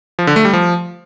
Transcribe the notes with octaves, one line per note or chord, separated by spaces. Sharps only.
F3
D3
A3
G3
F3